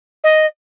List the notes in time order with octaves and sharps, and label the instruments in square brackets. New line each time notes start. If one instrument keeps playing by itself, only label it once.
[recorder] D#5